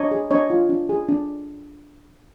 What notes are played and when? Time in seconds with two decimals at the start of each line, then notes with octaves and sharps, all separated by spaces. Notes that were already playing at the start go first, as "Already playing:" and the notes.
Already playing: D4 C#5 D#5
0.11 G#4
0.31 D4 C#5 D#5
0.50 F4
0.69 D4
0.89 G#4
1.08 D4